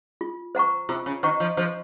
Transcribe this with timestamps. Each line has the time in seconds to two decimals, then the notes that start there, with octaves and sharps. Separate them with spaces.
0.21 F4
0.55 C5 F#5 A#5 C#6
0.89 C3 F4
1.06 C#3
1.23 D#3 C5 F#5 A#5 C#6
1.40 F3
1.57 F3 C5